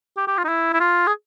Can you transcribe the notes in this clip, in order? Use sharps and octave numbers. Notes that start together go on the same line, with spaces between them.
G4
G4
F4
D#4
E4
E4
F4
G#4